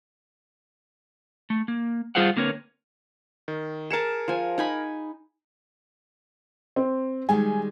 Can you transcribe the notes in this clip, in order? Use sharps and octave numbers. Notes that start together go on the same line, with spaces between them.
A3
A#3
G3 F4 G#4 C5 F5 F#5
D3 A#3 C4 A#4 B4 C#5
D#3
G#4 A#4 A5 C#7 E7
F3 G#5
D#4 G#5 B5
C4
D#3 G3 G#3 G#5